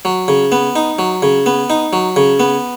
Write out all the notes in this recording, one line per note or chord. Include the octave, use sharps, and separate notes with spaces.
F#3
C#3
B3
D#4
F#3
C#3
B3
D#4
F#3
C#3
B3